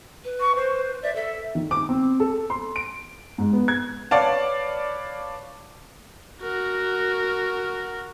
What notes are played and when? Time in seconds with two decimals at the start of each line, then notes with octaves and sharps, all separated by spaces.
0.24 B4
0.40 C#6
0.56 C5
1.03 D5 E5
1.15 A4 E5
1.55 D#3
1.71 D6
1.89 C4
2.20 A4
2.50 C6
2.76 D7
3.38 G#2
3.53 B3
3.68 G#6
4.11 B4 C#5 D5 F5 A5
6.42 F#4 A#4